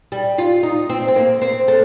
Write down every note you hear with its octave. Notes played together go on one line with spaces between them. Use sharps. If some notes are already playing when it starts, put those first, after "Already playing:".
G3
F4
D#4
C4
C4
A#3
C4
A3